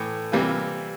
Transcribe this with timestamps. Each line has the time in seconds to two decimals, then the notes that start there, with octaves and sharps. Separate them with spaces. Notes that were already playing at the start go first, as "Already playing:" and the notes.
Already playing: A2 E3 A3
0.32 C3 E3 G3 A#3 F4